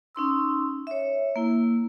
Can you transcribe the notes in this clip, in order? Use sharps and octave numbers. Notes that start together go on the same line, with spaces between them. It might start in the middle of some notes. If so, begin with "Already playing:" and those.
C#4 D#4 C6 E6
C#5 E5
A#3 E4